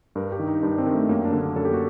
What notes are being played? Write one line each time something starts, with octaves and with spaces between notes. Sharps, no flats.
G2 A#4
G4
D#3
D#4
G2 D4
C4
D#3
A3
F#2 A#3
D4
D3
A#3
F#2 A4
G4
F#4